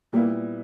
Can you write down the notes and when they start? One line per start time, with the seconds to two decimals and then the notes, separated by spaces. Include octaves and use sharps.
0.13 A#2 G3 A#3 B3 E4